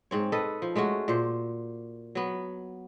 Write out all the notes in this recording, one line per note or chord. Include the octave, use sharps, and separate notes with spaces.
G#2 C4 C#5
A4 B4 D#5
F3
G#3 A3 C#4 F#4
A#2 C5
F#3 B3